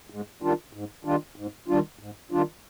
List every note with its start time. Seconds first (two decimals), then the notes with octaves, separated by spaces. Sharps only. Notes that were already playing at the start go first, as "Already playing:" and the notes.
0.10 G#2
0.42 D#3 G3 D4 F4
0.73 G#2
1.05 D#3 G3 D4 F4
1.36 G#2
1.68 D#3 G3 D4 F4
1.99 G#2
2.31 D#3 G3 D4 F4